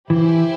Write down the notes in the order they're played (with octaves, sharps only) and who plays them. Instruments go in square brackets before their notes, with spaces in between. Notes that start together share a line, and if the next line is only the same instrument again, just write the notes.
[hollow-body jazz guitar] E3 [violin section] E4 G4 C5 E5 G#5